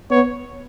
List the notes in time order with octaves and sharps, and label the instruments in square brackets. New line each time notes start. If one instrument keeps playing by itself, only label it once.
[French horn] B3 [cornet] C#5